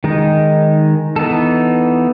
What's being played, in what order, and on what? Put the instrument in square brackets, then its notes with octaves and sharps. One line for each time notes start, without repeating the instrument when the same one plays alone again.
[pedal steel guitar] D#3 G#3 D#4
E3 B3 D#4 A4